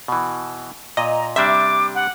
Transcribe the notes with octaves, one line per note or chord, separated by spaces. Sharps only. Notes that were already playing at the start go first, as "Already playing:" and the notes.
B2 E3
A#2 D#5 A#5
C3 G3 D4 E5 D6
F#5